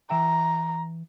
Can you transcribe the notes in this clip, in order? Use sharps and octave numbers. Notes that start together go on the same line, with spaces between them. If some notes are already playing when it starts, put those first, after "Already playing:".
E3 E5 G5 A#5